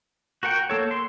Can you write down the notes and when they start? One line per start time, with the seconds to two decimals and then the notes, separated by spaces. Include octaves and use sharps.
0.43 F#4 A#4 F#5 G5
0.70 A#3 A4 C#5
0.91 C6